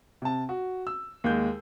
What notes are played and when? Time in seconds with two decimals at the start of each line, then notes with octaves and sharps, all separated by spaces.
0.22 C3 A5
0.49 F#4
0.87 E6
1.24 D#2 G#3 G6